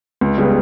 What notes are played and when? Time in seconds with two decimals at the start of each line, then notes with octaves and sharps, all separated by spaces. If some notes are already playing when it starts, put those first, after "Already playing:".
0.21 C#2
0.38 C#3 G3 B3